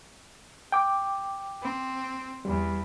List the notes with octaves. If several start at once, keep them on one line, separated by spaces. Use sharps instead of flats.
G5 D6
C4
E2 G3